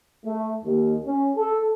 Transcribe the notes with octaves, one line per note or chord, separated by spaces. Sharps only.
A3
D#2
C#4
A4